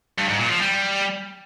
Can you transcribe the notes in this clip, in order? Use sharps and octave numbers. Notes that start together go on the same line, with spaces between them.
G2
G#2
A#2
F3
G3